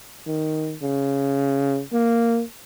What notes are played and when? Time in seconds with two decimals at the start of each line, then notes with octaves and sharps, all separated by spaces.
0.27 D#3
0.82 C#3
1.93 A#3